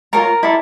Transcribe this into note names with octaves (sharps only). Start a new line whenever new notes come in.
F4 A4 A#4 C#5 A#5
E4 A4 D5